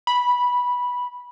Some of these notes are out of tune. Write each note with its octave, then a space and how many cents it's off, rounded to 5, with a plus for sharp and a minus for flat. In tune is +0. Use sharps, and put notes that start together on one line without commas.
B5 -10